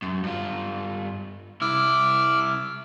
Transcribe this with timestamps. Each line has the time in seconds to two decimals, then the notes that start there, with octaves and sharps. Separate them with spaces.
0.02 F#2
0.23 G2 F4
1.61 C2 E4 D6 E6 F6